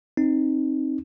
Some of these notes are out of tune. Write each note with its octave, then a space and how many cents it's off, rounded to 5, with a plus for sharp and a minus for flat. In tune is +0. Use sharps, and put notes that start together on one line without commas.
C4 +25 D#4 +0